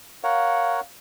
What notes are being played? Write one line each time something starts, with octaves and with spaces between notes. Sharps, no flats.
A#4 C#5 F5 F#5